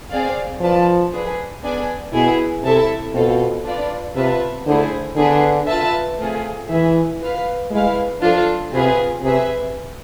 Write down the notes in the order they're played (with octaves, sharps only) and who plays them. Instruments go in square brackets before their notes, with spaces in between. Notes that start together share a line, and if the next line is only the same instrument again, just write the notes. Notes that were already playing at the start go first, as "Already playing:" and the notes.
[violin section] C4 G#4 D5 F5
[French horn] F3 [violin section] F4 B4 D5 A5
[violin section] D4 G#4 B4
B3 D4 G#4 D5 G#5
[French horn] B2 [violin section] B3 E4 G#4
[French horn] C3 [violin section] E4 A4 E5 A5
[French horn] B2 [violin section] C4 F4 A4
[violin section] D4 F4 B4 D5
[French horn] C3 [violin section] B3 F4 B4 E5 A5
[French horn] D3 [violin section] A3 E4 G#4 C5
[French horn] D3 [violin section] B3 D4 G#4 B4
[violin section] F4 B4 E5 A5
A3 C4 F4 G#4
[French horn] E3 [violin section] G#4 B4 E5
[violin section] F4 B4 F5
[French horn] G#3 [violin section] E4 B4 F5
[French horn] F3 [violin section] D4 F4 A4
[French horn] C3 [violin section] C4 F4 G#4 B4
[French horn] C3 [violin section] G#4 B4 E5